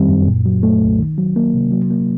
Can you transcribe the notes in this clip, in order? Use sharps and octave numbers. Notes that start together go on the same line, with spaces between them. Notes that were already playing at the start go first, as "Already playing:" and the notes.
Already playing: F2 D#3 G3 C4
F#2
A#2
F#3
A3
C2
D#3
F#3
A#3
C3
F#3
A#3